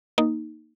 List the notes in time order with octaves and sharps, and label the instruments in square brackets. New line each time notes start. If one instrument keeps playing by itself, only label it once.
[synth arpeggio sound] A#3 D#4